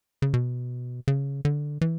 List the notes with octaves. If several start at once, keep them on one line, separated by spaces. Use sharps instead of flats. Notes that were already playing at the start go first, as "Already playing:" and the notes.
C#3
B2
C#3
D3
E3